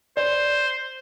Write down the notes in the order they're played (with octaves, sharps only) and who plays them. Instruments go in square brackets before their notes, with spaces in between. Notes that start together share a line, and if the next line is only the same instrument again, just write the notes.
[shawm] C5 [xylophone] D5